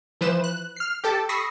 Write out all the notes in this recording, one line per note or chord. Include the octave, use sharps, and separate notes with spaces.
E3 F3 B4 C5 E7
F#6
F6 C7
G4 A4 A5 D6
B5 C#6 D#6 E6 A#6 C7